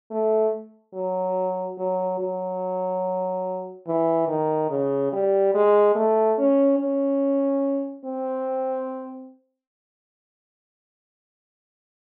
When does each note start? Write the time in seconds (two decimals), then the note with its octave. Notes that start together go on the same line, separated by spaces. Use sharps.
0.11 A3
0.94 F#3
1.78 F#3
2.20 F#3
3.87 E3
4.28 D#3
4.70 C#3
5.12 G3
5.54 G#3
5.95 A3
6.38 C#4
6.79 C#4
8.05 C4